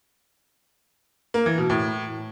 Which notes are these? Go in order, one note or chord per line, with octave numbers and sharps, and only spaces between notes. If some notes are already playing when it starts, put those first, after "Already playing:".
A#3
E3
B2
A2